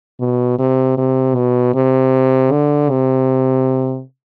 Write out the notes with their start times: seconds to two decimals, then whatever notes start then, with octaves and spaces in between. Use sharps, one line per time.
0.20 B2
0.59 C3
0.97 C3
1.36 B2
1.75 C3
2.52 D3
2.90 C3